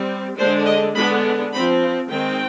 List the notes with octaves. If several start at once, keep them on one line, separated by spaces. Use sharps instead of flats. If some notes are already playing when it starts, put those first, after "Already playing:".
Already playing: G3 C4
D3 G#3 D4 C5
D#5
D3 G#3 B3 D4 B5
F3 C4 B5
D#3 G#3 C4 G5